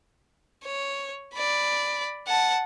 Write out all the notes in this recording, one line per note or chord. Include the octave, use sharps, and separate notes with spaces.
C#5
D5 B5
F#5 A5